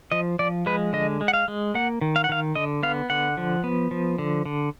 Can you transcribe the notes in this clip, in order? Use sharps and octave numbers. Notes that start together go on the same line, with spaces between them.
F3 D#5
F3 D5
G#3 B4
D3 D#5
G#3
F#5
F5
G#3
A#3 F#5
D#3
F5
F#5
D#3 F5
D3 D#5
B3 F5
D3 F#5
F3
B3
F3
D3
D3